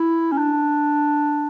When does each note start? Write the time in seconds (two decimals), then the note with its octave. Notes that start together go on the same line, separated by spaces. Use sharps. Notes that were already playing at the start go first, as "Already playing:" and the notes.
Already playing: E4
0.32 C#4
0.38 D4